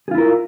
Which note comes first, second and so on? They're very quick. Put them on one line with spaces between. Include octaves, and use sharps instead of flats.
G#4 F4 E4 A#4